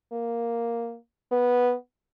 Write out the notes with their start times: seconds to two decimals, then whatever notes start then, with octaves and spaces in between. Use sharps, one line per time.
0.12 A#3
1.32 B3